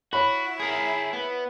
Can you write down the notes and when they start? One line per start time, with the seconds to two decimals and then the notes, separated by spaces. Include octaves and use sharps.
0.13 E4 F#4 C#5 B5
0.60 G#4 A#4
1.13 B3